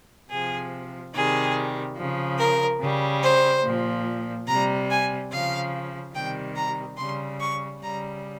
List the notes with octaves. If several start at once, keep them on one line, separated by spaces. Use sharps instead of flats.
C3 F3 G#4
C3 D#3 G3 G#4
C#3 F3
A#4
C#3 G3
C5
A#2 F3
C3 G3 A#5
G#5
C#3 F3 F5
C3 D#3 G3 G5
A#5
C#3 G3 C6
C#6
C#3 G3 A#5